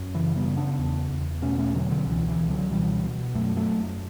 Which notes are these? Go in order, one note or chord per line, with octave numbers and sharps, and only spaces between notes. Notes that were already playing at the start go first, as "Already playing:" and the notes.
Already playing: F#2
C#3 E3
G3 B3
C#3
B3 D4
E2
E2
B2 A3 C#4
A3 C#4
B2 D3 F#3
D3 F#3
C#2 E3
E3
C#2
D3 F#3
B2 E3 G3
B2
F#2 F#3 A3
F#3 A3
F#2